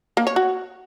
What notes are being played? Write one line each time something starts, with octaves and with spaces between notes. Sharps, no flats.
A#3
C#5
F#4